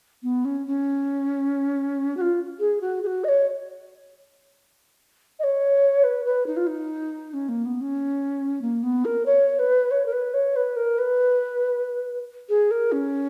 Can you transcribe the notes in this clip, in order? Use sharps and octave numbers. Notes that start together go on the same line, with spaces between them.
B3
C#4
C#4
F#4
F4
G#4
F#4
G#4
F#4
D#5
C#5
D#5
C#5
B4
B4
D#4
F4
D#4
C#4
A#3
B3
C#4
A#3
B3
A#4
C#5
B4
C#5
A#4
B4
C#5
B4
A#4
B4
G#4
A#4
C#4